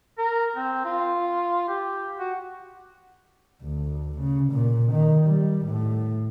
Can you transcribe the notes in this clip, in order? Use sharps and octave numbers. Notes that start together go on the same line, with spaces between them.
A#4
C4
F4
G4
F#4
D2
C#3
A#2
D#3
G3
A2